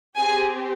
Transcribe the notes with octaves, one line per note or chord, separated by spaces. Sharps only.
C4 G4 G#4 G#5